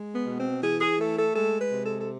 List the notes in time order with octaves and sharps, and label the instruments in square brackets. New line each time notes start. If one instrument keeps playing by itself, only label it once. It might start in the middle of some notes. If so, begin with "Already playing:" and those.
Already playing: [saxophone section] G#3
B3
B2
C4
E3 G#4
G#4
A3 A4
A4
G#3 A4
B4
C3
A4
A4